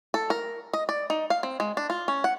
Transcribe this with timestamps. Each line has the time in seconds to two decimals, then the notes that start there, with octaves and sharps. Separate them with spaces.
0.14 A4
0.30 A#4
0.73 D#5
0.89 D5
1.10 D#4
1.30 F5
1.43 C4
1.60 G#3
1.77 D4
1.90 F4
2.08 C#4
2.24 F#5